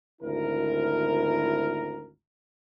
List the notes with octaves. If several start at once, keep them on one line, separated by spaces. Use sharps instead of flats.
G#1 D2 E4 A#4